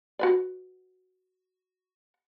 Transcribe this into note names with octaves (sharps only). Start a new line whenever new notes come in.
F#4 B4 D5